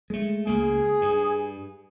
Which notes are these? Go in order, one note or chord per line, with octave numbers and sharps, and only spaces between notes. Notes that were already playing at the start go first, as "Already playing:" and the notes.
G#3 A3
C#2 A#3 G#4
G2